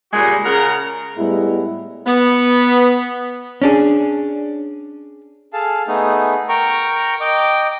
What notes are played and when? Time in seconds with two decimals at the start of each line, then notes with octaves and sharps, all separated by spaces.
0.13 A#2 C#3 G3 G#3 D#4 F#4
0.44 C#3 G#4 A#4 F#5 A#5
1.17 A2 G3 G#3 B3 E4
2.06 B3
3.62 C#4 D4 G#4
5.53 G#4 A4 F5 A5
5.87 A3 B3 D#4 G#4
6.49 A#4 G5 A#5 C#6
7.20 D#5 G5 D6